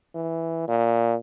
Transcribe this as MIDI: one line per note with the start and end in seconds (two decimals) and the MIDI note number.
0.14 0.65 52
0.68 1.15 46